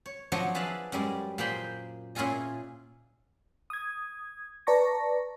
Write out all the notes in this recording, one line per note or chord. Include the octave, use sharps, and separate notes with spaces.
C#5
F3 F#3 D4 C#5 D#5
G#4 B4 D5 E5 F5 A5
F#2 G3 G#3 D5
A#2 A#3 G#4 C5 B5 C6
A#2 C#4 E4 F4 G#4 D#5
D#6 G#6
B4 D5 A5 A#5 C#6 A#6